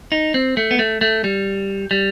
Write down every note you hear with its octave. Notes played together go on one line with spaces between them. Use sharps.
D#4
C4
A3
B3
A3
A3
G3
G3